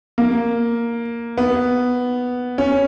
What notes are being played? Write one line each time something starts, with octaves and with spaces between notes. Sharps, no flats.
A#3
B3
C#4